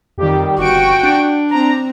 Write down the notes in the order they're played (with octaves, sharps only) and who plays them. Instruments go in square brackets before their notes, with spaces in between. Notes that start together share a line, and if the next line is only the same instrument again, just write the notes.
[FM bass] F2 [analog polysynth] D#3 G3 G4
[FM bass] G1 [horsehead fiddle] F#4 G5 [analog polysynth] C#6 D7
[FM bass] D4
[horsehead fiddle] C4 [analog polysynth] A#5